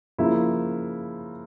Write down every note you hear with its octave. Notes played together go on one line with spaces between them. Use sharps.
C#3 F3 A#3 E4